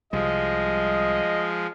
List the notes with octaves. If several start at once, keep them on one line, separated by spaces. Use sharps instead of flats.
C2 F3 G3 G#3 D#5